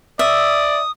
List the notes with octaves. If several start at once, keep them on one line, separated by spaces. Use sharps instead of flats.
D5 E5 D#6